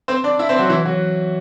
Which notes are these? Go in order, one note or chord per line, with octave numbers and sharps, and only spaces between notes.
C4 C5
D4 D5
E4 E5
C4 C5
F#3 F#4
E3 E4
F#3 F#4